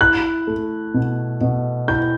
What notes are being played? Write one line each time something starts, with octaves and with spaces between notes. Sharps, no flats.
E4 F#6
A3
B2
B2
E4 G6